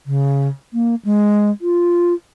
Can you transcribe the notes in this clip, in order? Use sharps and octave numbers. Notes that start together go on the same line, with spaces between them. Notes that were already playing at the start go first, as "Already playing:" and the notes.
C#3
A#3
G#3
F4